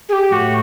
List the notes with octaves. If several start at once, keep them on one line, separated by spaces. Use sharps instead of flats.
G#4
G4
A2 F#4